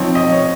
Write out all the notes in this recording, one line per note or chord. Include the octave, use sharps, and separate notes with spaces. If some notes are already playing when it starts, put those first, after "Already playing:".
Already playing: F3 C4 D#4 C#5
D#5
C#5